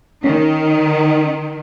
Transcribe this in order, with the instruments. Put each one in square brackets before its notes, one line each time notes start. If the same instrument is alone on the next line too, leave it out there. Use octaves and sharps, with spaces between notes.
[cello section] D#3 [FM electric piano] C#4